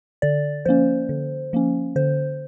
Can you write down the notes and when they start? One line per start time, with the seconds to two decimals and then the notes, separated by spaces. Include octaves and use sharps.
0.22 D3 D5
0.65 F3 A#3 C#4 C5
1.09 D3
1.53 F3 A#3 C#4
1.96 D3 C5